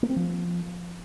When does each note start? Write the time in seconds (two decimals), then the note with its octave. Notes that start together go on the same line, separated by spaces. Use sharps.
0.03 A#3
0.09 C4
0.16 F3